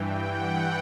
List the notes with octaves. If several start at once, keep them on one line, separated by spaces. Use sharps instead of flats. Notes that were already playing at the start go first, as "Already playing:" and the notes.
Already playing: G2 E3 G5
F#5